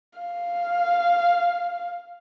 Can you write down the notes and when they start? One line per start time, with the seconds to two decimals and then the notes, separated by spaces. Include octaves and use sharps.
0.19 F5